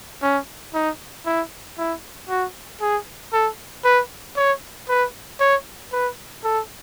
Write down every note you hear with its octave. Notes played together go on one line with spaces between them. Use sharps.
C#4
D#4
E4
E4
F#4
G#4
A4
B4
C#5
B4
C#5
B4
A4